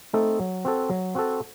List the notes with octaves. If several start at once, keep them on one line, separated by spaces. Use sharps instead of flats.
A3 C4 D#4 A4
F#3
C4 F#4 A4
F#3
C4 F#4 A4